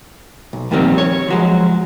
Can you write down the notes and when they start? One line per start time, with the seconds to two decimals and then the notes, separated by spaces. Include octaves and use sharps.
0.53 B1
0.71 F2 A#2 D#3 G3 A#3 C4
0.98 C#5
1.28 F3 F#3 G#3